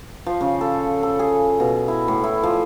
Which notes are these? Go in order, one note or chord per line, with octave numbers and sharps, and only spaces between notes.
F3
C#3
A4
A4
G#4
B2
E4
A2
E4
F3